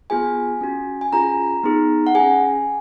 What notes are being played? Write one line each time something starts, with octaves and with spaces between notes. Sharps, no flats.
B3 F4 G#4 G#5
C#4 F#4
G#5
C#4 F4 G#4 A#5
B3 D#4 G#4
F#5
C#4 G#4 G#5